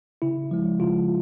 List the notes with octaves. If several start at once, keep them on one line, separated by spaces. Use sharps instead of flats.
C#3 E4
F3 G#3
C#3 F4